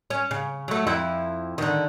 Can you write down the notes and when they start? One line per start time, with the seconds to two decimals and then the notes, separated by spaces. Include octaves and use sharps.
0.10 C#4
0.31 C#3
0.68 F#3 A3
0.87 F2 E4 E5
1.58 D3 D#3